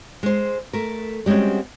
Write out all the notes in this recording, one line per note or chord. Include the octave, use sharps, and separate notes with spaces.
G#3 C5
A3 A#4
G3 G#3 C4 C#4 F#4